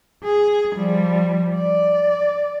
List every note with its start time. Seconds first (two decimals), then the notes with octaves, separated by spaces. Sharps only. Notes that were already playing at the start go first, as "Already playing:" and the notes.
0.24 G#4
0.76 F3 G3
1.56 D5